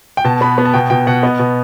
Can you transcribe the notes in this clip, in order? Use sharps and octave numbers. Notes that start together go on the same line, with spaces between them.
G5
B2 A5
B3 B5
B3
A5
B2 G5
B2 G5
B2 F#5
B3 D#5
B2